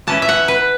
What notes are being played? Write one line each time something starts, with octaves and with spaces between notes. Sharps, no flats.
E3 C#4 E4 A5
E5
F#5
B4